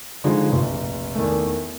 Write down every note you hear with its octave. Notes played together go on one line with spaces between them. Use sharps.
D3 F3 G#3 D#4
F1 A#1
E2 D#3 A3